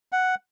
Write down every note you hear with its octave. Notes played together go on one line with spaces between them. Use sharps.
F#5